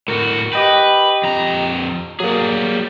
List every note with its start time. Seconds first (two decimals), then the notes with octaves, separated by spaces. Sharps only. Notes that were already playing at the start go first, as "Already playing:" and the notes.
0.08 A2 F#4 A#4
0.53 G4 B4 D#5 G5
1.24 F2 A#5
2.20 F#3 G3 A#3 G#4